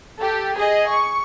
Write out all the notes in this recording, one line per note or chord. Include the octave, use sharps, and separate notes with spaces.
G4 A4
G#4 D#5
C#6